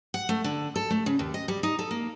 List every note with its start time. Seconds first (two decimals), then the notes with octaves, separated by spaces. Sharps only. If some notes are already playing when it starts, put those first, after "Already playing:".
0.14 F#5
0.29 A3
0.44 D3
0.76 A4
0.90 A3
1.06 C#3
1.19 D#2
1.34 D#5
1.48 G3
1.63 D#4
1.79 A4
1.91 A#3